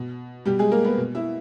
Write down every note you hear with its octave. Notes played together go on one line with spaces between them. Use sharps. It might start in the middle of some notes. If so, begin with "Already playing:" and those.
Already playing: B2
B2 G3 G4
G#3 G#4
A#3 A#4
B3 B4
B2
E4 E5